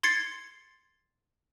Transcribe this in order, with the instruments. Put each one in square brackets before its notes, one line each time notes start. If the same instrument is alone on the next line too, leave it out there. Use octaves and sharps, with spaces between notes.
[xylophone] C6 G#6 A6 C7 C#7